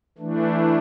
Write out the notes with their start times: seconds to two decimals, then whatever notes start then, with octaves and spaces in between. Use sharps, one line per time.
0.18 E3 A3 D4